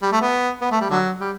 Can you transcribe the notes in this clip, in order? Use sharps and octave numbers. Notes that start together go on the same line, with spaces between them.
G3
A3
B3
B3
A3
G3
D3 F#3
G3